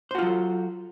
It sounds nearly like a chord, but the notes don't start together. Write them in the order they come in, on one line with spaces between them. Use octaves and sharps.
C5 F#4 F4 F#3 A4